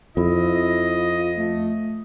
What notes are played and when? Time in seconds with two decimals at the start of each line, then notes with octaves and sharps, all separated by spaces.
0.17 F2 E4 F4 D#5
1.38 A3